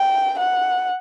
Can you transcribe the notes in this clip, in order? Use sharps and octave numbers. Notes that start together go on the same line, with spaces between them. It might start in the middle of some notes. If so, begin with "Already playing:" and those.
Already playing: G5
F#5